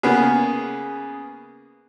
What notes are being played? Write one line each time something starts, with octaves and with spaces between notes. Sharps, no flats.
C#3 A#3 B3 G#4